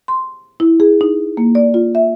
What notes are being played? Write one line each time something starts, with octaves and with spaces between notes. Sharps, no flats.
C6
E4
G#4
D#4
A#3
D5
F4
E5